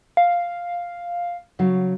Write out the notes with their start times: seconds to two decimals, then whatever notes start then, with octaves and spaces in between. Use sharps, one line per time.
0.17 F5
1.59 C#3 F#3 F5